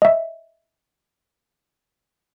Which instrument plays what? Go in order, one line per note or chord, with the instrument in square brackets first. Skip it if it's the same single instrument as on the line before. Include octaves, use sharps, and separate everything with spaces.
[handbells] D#5 E5